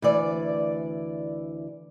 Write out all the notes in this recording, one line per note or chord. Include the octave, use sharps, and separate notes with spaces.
D2 E3 D5